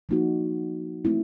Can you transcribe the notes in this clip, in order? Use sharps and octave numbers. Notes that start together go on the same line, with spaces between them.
F3 A#3 D#4 F#4
A3 C4 E4